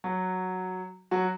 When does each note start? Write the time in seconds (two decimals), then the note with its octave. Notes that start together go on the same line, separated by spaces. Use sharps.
0.04 F#3 F#4
1.11 F#3 F#4